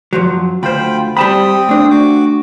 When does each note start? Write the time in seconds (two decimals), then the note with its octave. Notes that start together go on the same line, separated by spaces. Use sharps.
0.13 F#2 F3 F#3
0.63 D2 F4 C5 G5 B5
1.17 G3 C4 G5 A5 B5 D#6
1.69 A3 D4
1.90 F#4 D6